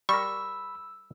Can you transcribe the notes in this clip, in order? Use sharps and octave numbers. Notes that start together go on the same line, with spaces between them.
G3 A#4 B5 C#6 E6